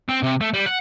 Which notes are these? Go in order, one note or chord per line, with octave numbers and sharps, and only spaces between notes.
C4
C3
A3
G3
F#5